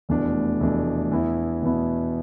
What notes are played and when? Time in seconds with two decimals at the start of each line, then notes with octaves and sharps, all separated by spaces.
0.09 F1 E2 B2 A3 D4
0.60 F1 E2 B2 A3 D4
1.11 E2 B2 B3 E4
1.62 E2 B2 B3 E4